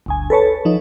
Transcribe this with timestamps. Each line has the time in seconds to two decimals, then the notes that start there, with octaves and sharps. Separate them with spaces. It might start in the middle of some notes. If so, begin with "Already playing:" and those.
0.06 G1 D2 G#5
0.30 A4 B4 C#5 A5
0.65 F3 D#4